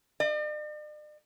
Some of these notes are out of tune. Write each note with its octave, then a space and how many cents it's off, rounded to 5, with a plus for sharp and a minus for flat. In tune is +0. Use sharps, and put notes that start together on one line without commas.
D5 +45